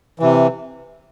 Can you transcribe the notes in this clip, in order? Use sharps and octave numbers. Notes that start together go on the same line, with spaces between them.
C3 E3